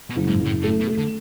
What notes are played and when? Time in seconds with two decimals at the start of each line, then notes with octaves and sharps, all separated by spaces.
0.10 B2
0.16 F#1
0.27 G#2
0.40 F#1
0.45 A2
0.63 A2 A3
0.81 B2
0.87 A3
0.98 D3